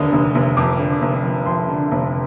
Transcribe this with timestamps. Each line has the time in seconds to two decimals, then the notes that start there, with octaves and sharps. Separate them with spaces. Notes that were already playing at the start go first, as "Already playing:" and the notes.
Already playing: F1 D#2 D3 D#6
0.12 F1
0.35 F1
0.57 F2 D6
0.79 D3
1.02 F1
1.23 F3
1.46 F2 C6
1.68 D3
1.91 F1